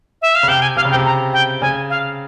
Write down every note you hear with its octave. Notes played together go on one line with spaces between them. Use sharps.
E5
F5
C#3
C3 G5
G#5
C3 F5
C#3
G5
C3
A#5
G5
C#3 G#5
F5